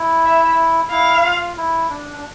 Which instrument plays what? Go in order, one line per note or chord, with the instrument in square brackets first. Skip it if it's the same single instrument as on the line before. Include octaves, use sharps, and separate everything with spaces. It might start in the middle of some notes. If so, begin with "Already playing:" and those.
Already playing: [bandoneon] E4
[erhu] E5
[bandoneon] E4 [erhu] F5
[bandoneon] F4
E4
D4
D4